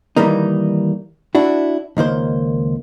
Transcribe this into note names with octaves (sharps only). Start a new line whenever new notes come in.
D#3 E3 G3 A#3 D#4
D4 E4 F#4
C#2 D#3 A#3 C5